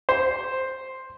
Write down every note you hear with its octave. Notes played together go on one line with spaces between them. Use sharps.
C5